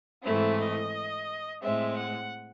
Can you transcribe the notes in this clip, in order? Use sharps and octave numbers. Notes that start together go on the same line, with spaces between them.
G#2 E3 A3 C4 E4
D#5
A2 G#3 C4 E5
F#5